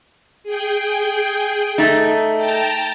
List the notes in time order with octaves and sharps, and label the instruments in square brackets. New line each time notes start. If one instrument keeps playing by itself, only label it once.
[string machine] G#4 G5
[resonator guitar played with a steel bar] A3 D#4
[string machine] G5 A5 A#5